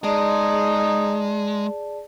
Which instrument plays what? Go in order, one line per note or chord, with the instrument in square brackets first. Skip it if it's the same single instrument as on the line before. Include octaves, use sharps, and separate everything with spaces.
[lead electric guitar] G#3 [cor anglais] D#4 [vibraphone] G#4 D5 A5